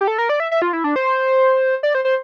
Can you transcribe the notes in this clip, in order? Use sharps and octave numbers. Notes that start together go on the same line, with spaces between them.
G4
A4
A#4
D5
E5
E5
F4
E4
D4
C5
D5
C5
C5